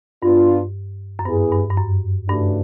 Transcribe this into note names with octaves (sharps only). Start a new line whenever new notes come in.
G2 B3 D4 F4
F#2
G2 B3 E4 G#4
G2
G2
F#2
G2 C#3 E3 A3 D4 F#4